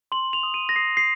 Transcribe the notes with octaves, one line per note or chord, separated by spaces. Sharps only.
C6 F#7
F7
D#6
D#7
A#6
D#6 C7
C7